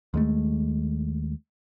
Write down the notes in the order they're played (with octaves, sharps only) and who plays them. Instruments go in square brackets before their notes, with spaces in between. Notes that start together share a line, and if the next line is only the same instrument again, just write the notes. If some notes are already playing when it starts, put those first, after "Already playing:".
[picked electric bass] D#2 G#3 A3